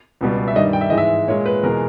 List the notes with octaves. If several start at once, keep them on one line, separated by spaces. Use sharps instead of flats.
C#2 B2 G3
E5
G2 D#3 G3 D#5
G5
E5
G#2 E3 G#3 D#5
E5
A#2 G#3 C#5
B4
E2 B2 G#3 A#4